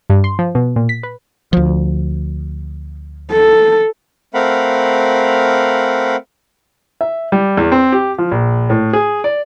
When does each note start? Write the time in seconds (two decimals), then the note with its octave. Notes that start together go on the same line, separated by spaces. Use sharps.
0.10 G2
0.24 C6
0.39 F3
0.55 B2
0.76 A#2
0.89 B6
1.03 B4
1.53 D2 F3
3.32 A4
4.34 A3 C4 A#4 F5 F#5 B5
7.01 E5
7.32 G3
7.57 E2
7.72 C4
7.92 G4
8.18 F3
8.31 A#1
8.70 A2
8.93 G#4
9.24 D5